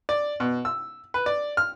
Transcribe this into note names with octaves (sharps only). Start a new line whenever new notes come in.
D5
B2
E6
B4
D5
F6